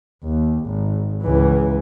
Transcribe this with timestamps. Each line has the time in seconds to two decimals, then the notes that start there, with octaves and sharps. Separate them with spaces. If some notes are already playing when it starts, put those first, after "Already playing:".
0.24 D#2
0.66 G#1
1.23 C#2 E3